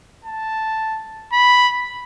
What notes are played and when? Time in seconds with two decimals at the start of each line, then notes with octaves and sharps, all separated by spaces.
0.25 A5
1.32 B5